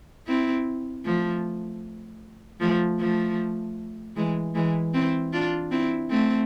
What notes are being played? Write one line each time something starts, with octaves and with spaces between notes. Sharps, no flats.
C4 E4
F3 A3
F3 A3
F3 A3
E3 G#3
E3 G#3
C4 E4
D4 F4
C4 E4
A3 C4